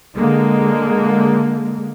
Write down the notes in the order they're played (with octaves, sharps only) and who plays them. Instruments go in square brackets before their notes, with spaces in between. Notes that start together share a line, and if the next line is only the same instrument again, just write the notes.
[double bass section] D3 G#3 A#3